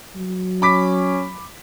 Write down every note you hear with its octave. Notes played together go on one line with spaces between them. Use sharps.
F#3
C#4 B5 D6 B6